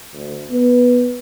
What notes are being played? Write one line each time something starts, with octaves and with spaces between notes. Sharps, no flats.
D2
B3